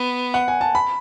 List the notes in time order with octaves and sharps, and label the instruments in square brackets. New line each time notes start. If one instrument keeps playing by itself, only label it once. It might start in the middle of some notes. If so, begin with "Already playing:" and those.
Already playing: [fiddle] B3
[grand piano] F#5
G#5
A5
B5